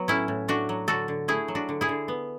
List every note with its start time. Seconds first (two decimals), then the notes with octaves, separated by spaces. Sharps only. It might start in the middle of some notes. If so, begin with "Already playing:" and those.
Already playing: F#3 B3
0.08 A2 C#4 E4
0.28 A2
0.48 A3 D4 F#4
0.69 F#3
0.88 D3 F#4 A4
1.08 D3
1.28 A3 E4 G#4
1.48 F#3
1.55 D4 F#4
1.69 D3
1.81 E4 G#4
1.89 D3
2.08 B3